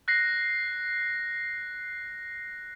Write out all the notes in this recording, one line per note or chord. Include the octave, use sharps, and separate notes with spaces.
F#6 A#6 C7